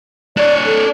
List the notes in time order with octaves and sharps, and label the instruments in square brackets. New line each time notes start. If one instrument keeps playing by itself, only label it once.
[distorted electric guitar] D4 C#5 [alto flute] D5
[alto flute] A4